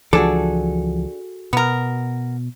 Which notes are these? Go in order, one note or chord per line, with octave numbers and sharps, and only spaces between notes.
C#2 E3 F3 D4 F#4 G#4 A4
B2 B3 A#4